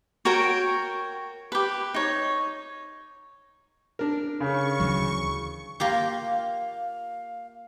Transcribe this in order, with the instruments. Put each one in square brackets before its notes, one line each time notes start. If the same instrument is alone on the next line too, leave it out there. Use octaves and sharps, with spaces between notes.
[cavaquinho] F#4 A#4 C#5 G5
G4 B4
D#4 C#5
[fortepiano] D4 A#4
[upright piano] C#3 [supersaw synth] C#6
[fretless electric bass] D2 E3 F#3
[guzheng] A#3 F4 G4 [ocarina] F5